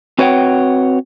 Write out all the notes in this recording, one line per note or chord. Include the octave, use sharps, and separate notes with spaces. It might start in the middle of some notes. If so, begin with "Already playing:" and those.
C4 F#4 B4 C#5 F#5 G5